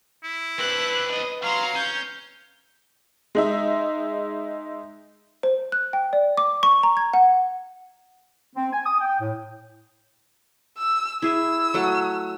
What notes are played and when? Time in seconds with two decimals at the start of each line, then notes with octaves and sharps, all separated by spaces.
0.24 E4
0.59 C4 D4 B4 F#6
1.12 D#5
1.43 F#3 F5 A#5 C6
1.75 C#4 G6
3.35 G#3 D#4 E5
5.43 C5
5.72 F#6
5.93 G5
6.13 D5
6.37 D6
6.63 C#6
6.83 A#5
6.97 G#6
7.13 F#5
8.56 C4
8.73 G#5
8.86 D#6
9.01 G5
9.20 A2
10.78 E6
11.22 E4 G#4 E5 E6
11.74 F#3 A3 F#5